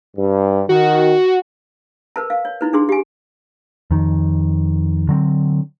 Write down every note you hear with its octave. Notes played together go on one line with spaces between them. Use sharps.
G2
D#3 F#4
A#4 B4 A5
F5
C#5
D#4 E4 B4
D4 G#4 C6
G4 G#5
F2 D#3
D3 F#3 C4